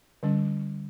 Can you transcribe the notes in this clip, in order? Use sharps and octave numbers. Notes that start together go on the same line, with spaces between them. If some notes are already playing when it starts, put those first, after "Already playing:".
D3 G3 C#4